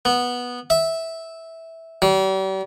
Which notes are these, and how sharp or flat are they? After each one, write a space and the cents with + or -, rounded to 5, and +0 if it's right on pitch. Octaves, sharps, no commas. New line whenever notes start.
B3 -10
E5 -10
G3 -40